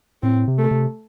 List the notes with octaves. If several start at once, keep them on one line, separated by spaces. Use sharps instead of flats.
A2 C4
C3
A3
C3